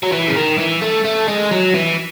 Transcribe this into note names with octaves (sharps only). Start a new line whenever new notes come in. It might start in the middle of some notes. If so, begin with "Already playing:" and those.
F#3
E3
C#3
D#3
E3
A3
A3
G#3
F#3
E3